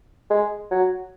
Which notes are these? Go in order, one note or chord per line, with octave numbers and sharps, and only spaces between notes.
G#3
F#3